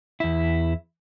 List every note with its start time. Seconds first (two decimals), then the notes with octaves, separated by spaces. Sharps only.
0.20 E2 E4